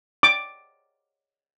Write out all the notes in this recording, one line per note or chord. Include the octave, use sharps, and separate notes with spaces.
D6